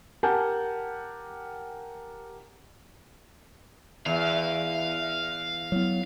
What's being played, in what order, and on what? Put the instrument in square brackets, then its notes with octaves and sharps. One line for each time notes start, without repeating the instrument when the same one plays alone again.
[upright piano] G4 A#4 F#5 G#5 A5 G6
[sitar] E2 [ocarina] E5 [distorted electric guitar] F5
[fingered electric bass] F#3 B3 [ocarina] E4